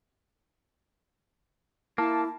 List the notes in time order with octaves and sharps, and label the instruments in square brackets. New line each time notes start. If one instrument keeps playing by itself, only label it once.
[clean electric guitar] A#3 [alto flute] E4 [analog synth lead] A5